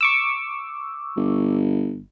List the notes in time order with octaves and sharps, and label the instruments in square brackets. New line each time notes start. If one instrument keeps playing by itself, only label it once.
[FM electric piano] C#6 D6 E6
[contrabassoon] G1